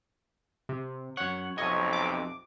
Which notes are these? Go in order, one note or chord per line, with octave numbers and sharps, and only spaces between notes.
C3
F#2 C#5 F#5
B1 F2 C3 C#5 D#5
D6